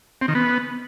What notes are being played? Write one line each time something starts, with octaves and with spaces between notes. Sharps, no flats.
C4
D#3
B3